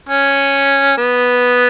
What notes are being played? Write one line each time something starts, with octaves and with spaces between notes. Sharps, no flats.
C#4
B3